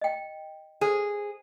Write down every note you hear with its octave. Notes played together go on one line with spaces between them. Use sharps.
D#5 G5
G#4 C5